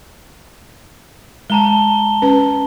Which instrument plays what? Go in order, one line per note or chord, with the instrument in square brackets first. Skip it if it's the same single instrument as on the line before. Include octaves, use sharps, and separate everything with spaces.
[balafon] G#3 [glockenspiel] A5 A#5 G7
[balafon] C#4 B4